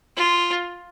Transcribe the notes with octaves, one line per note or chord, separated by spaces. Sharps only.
F4